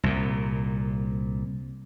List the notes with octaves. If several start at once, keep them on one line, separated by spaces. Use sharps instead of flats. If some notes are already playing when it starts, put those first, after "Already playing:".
C2 A#2